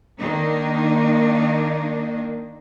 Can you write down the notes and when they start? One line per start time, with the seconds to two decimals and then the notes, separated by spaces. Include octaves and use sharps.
0.17 D#3 A#3 D4 D#4